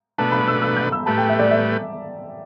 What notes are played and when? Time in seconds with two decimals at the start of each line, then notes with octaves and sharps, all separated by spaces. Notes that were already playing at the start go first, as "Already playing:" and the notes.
0.18 B2 A3 D4 B4 A5
0.32 B5
0.48 E6
0.62 E6
0.77 G6
0.92 E6
1.06 A2 A3 G4 B4 A5
1.18 G5
1.29 E5
1.39 D5
1.51 E5